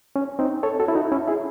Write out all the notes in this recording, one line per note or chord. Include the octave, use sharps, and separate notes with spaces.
C#4
C4 D#4
A4 C#5
F#4 A4
E4
D#4 F#4
C#4 E4
E4 G#4